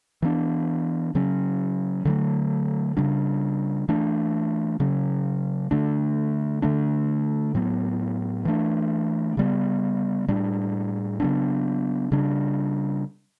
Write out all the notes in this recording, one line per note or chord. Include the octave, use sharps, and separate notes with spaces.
E3 B3 D4
C#3 F#3 C#4
D3 F#3 A3
C#3 G3 D4
E3 A3 D4
C#3 F#3 C#4
D3 A3 D4
D3 A3 D4
A2 F#3 B3
E3 A3 D4
C#3 G3 B3
A2 G3 D4
C#3 F#3 B3 D4
C#3 G3 D4